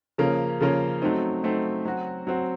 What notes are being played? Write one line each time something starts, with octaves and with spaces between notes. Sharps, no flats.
C#3 F3 A#3 C#4
C#3 F3 A#3 C#4
F#3 A3 C4 D#4
F#3 A3 C4 D#4
F#3 C4 F#4
F#3 C4 F#4